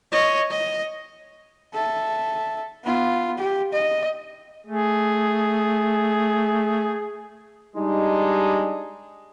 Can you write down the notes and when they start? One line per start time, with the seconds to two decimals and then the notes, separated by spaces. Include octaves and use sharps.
0.12 C#5 D#5
0.51 D#5
1.74 A4 E5
2.84 B3 F4
3.38 G4
3.73 D#5
4.66 A3 G#4
7.76 G3 G#3 D4 D#4